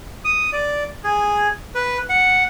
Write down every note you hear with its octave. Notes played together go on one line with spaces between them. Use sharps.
D#6
D5
G#4
B4
F#5